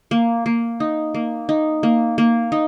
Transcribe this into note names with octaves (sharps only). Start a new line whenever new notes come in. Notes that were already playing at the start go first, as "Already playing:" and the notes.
A#3
A#3
D#4
A#3
D#4
A#3
A#3
D#4